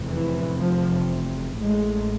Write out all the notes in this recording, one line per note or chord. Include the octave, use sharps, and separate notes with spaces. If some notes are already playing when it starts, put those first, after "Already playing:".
Already playing: F1 E2 C3
E3
F3
A1 A2 G#3